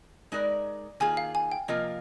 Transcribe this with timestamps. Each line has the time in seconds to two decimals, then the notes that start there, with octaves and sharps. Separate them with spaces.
0.32 G#3 D#4 A#4 D5
1.00 D#3 A#3 F4 G#4 G#5
1.17 F5
1.35 G#5
1.52 G5
1.68 C3 F3 A#3 F4 A#4 D#5